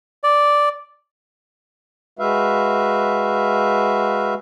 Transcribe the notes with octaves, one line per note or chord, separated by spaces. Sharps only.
D5
G#3 F#4 B4 E5 F5